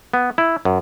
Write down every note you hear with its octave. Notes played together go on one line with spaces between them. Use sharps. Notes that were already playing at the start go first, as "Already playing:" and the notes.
B3
E4
F#2